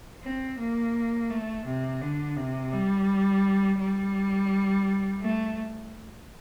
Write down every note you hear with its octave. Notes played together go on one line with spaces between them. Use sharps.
C4
A#3
A3
C3
D3
C3
G3
G3
A3